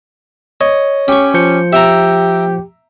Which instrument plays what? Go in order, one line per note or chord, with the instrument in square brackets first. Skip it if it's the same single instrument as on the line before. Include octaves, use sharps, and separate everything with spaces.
[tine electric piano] C#5 [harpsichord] D#5
[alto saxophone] C#4 [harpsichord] G4 C#6
[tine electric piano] F3 G6 C#7
[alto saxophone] G4 [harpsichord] E5 G5 A#5